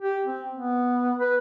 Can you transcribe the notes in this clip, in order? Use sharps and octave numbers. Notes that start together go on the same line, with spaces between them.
G4
C4
B3
B4